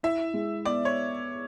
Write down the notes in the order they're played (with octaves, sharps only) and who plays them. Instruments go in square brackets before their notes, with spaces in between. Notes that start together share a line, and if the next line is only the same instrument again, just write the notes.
[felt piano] E4 [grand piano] E5
[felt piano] G#3
[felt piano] B3 [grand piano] D5
[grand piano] C#5